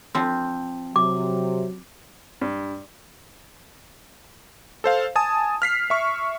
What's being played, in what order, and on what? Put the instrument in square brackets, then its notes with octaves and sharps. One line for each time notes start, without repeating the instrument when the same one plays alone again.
[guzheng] F3 C4
[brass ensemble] C3 [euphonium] F#3 [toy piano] D6
[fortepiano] G2
[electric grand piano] A4 C5 F5
G#5 A5 D#6
F6 B6 C7
E5 C#6